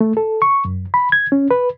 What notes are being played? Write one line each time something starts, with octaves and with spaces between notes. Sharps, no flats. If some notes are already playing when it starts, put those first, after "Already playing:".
A3
A4
C#6
F#2
B5
G#6
C#4
B4